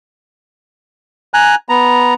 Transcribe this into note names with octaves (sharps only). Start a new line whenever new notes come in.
G#5 A#5 F#6
B3 A#5